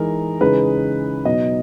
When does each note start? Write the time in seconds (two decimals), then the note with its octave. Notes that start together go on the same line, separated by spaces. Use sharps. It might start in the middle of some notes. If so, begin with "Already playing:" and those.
Already playing: E3 G#3 D#4 A#4
0.41 C#3 E3 G#3 D#4 B4
1.25 B2 F#3 B3 D#4 D#5